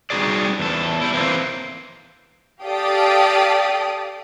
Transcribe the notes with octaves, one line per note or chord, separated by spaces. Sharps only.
G3 D#4 F#4 G#4 D5
E2 A4
G3 E4
E3 A#3 C4
G4 A4 D5 F5 G5 D#6